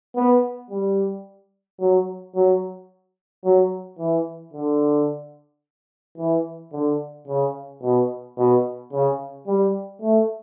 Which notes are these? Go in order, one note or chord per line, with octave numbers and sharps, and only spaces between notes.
B3
G3
F#3
F#3
F#3
E3
D3
E3
D3
C#3
B2
B2
C#3
G3
A3